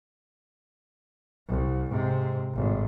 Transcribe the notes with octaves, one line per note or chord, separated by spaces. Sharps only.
C2
G#2 C3
G#1 A2